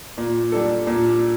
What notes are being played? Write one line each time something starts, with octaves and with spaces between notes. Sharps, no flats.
A#2
G3 D4 A4
A#2